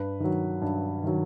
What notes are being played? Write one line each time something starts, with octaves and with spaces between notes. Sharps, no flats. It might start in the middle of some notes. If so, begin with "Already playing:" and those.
Already playing: G2 B4
D#3 F#3
G2
D#3 F#3